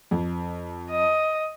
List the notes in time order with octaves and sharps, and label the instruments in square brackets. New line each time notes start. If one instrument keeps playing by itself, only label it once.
[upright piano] F2
[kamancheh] D#5